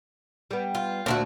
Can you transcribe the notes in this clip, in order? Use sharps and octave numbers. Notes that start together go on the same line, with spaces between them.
G3 B3
F4
D2 A#2 A3 D4 F#4 C5